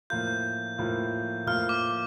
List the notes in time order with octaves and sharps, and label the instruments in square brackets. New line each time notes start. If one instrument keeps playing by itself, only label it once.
[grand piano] A2 F3 A#3 F4 [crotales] G6
[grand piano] A2 F3 A#3 F4
[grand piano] A2 F3 A#3 F4 [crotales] F6
[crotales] D6